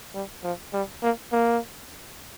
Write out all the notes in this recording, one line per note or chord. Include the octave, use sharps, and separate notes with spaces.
G3
F3
G3
A#3
A#3